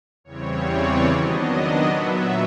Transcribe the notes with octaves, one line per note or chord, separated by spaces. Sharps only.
E2 C#3 E3 G3 C4 C#5
D5
D#3 F#3 B3 D4 D#5
A#2 F#3 B3 E5